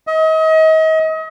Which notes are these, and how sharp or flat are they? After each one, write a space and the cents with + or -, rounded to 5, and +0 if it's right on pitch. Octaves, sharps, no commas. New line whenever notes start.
D#5 +35